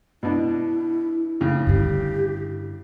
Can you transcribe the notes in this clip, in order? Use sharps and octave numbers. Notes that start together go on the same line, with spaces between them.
B2 D4 E4
A2 C#3
G2 D3 G4